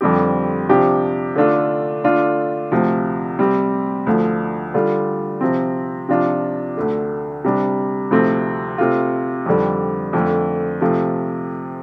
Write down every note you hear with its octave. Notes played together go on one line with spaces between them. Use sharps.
F2 D3 G3 C4 G4
C3 F3 D4 G4
D3 A3 D4 F4
D3 A3 D4 F4
D2 C3 F3
C3 G3 C4 G4
D2 D3 F3
D3 G3 F4
C3 F3 C4
C3 F3 D4 F4
D2 D3 A3
C3 G3 D4
D2 C3 F3 A3 C4
C3 A3 F4
F2 D3 G3
F2 D3 A3
C3 F3 A3